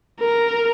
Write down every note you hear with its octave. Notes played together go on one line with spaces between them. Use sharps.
A#4